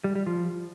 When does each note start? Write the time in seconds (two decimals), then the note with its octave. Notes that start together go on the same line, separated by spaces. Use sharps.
0.04 G3
0.15 G3
0.27 F3